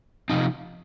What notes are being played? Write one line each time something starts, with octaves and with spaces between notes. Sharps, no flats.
C3 F3 C4 D#4